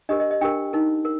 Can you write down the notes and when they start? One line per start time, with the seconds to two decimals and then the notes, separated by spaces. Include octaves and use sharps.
0.09 D4 G4 A#4 D#5
0.20 D#5
0.31 D#5
0.41 D4 G4 A#4 G5
0.73 D#4 A#4
1.05 A#4